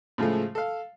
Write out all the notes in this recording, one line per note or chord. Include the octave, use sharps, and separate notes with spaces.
A2 C#3 F3 G#3 A3
A4 F5